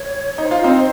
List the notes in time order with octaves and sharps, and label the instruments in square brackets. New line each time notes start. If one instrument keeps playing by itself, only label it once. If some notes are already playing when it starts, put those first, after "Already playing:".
Already playing: [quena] C#5
[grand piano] D#4 [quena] C#5
[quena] C5
[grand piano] F4
C4 D#4